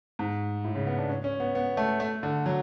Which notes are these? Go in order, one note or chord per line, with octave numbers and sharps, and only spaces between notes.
G#2
A2
C#3
B3
D4
C#4
C#4
B3
B3
A3
A3
D3
F#3